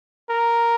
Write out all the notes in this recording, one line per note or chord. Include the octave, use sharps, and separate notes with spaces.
A#4